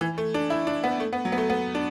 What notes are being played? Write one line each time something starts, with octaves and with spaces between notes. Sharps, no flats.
E3
A3
D4
E4
D4
B3
A3
B3
F#3
B3
A3
B3
D4